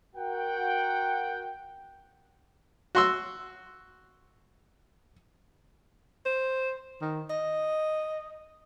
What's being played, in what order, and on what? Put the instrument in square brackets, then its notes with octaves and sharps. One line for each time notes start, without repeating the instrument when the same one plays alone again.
[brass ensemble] F#4 A#4 F#5 G5
[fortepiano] F#4 C6 E6
[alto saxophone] C5
D#3
D#5